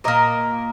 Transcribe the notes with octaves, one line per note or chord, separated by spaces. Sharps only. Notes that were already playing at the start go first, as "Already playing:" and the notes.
A#2 A#3 A#4 D#5